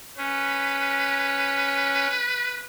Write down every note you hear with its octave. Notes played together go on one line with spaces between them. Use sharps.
C#4 B4